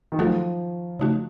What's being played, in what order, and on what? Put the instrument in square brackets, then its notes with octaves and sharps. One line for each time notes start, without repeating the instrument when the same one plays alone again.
[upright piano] D#3
[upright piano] F3 [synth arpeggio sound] F#3 A3 D#4 F#4 A4
[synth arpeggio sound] C#3 A3 D#4 F#4